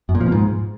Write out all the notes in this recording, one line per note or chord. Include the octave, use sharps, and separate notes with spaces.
F#2
A#2
F3
B2
G#2